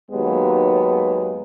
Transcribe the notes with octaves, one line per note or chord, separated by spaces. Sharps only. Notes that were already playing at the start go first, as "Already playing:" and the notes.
D#2 F#3 G#3 B3 G4